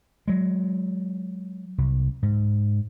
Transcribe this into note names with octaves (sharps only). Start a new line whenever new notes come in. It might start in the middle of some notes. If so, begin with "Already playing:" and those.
F#3 G#3
C2
G#2